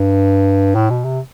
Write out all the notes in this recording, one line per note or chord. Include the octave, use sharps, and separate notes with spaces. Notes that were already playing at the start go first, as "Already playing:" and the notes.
Already playing: G2
A2
B2
C3